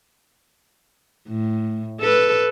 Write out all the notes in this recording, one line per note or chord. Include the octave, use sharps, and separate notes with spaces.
A2
A4 B4